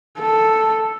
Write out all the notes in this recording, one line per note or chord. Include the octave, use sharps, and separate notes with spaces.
A4